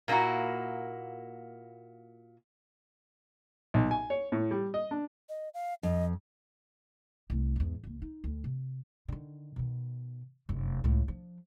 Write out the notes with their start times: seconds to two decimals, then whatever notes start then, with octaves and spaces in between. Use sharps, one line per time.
0.08 A#2 A#3 D4 E4 F#4
3.74 B1
3.91 G#5
4.10 C#5
4.32 A2
4.51 G3
4.74 D#5
4.91 D4
5.29 D#5
5.54 F5
5.83 F2 D#5
7.30 C2 A3
7.56 E2 G#2
7.84 C#2 A#3
8.02 D#4
8.24 D2
8.44 C3
9.08 D3 D#3
9.56 B2 D#3
10.49 F1 F#2
10.84 C#2 A2
11.08 F3 D4